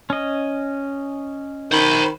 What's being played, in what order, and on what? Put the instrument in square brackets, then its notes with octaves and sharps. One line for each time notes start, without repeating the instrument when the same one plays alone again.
[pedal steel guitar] C#4 D#5
[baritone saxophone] D#3 [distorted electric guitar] C5 B5